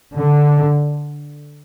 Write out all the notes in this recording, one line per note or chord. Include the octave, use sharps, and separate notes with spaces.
D3